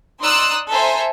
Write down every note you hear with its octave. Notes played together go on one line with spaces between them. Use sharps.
D#4 D5 C6 D#6 E6 F#6
A4 C5 E5 G#5 A#5